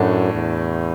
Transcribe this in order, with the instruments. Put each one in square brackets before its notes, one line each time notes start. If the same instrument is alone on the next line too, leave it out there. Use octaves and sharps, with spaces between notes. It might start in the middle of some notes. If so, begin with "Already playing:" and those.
Already playing: [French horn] F#2 [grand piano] A2 A3 D4 F#4
[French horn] E2